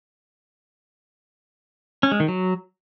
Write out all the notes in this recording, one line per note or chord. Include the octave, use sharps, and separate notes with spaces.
C#4
G#3
D#3
F#3